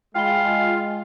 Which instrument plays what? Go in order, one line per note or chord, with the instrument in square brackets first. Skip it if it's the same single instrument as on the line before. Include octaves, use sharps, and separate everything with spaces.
[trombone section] G#3 [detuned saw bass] F4 [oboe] F5 [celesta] G5 B5 G7